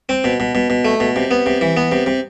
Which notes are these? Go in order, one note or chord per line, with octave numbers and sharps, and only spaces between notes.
C4
B2
B2
B2
B2
A3
B2
C3
B3
C3
E3
B3
C3
C3